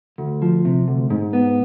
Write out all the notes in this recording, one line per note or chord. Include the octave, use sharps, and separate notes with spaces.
D2
F3
C3
D2
G#2
B3